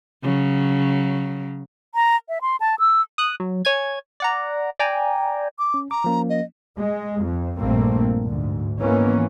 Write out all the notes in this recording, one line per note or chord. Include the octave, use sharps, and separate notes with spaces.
C#3 F#3
A#5
E5
C6
A5
E6
D#6 F#6
F#3
C#5 G#5 G#6
D5 F#5 A#5
D5 G5 G#5 A#5
D6
C#4
A#5 D6
F3 A#3 C#4
D#5
G#3
F2
A#1 G2 A3 A#3 C4
D2 G#2
G#2 D#3 E3 A#3 B3 C#4